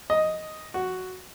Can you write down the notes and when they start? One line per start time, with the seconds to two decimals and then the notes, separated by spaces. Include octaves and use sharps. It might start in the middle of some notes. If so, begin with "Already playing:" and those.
0.10 D#5
0.74 F#4